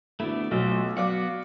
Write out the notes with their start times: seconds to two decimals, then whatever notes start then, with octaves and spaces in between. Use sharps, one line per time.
0.20 D2 A3 B3 E4 D5
0.51 B1 F#3 A3 F4 C5
0.97 F#3 B3 F#4 D5 F5 D6